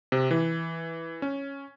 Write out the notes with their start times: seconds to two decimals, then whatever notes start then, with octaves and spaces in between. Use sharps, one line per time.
0.12 C3
0.31 E3
1.22 C#4